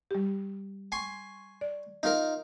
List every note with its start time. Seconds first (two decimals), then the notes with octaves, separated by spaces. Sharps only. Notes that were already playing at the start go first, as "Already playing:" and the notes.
0.11 G3 G4
0.92 G#5 C6 C#6
1.61 D5
2.03 D#4 F4 A#4